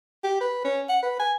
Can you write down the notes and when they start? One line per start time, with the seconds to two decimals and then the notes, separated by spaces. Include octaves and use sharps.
0.24 G4
0.41 B4
0.65 C#4
0.89 F#5
1.03 B4
1.20 G#5